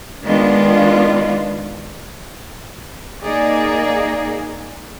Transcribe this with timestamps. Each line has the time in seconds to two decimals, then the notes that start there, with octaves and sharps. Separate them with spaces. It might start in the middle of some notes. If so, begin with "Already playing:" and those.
0.24 D#3 G#3 B3 D4 F4
3.23 A#3 D#4 G#4 D5